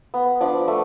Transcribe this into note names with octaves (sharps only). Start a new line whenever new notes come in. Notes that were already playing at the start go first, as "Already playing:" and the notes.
B3
F3 D4 D5
A3